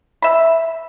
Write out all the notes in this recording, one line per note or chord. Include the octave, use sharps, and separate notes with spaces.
E5 B5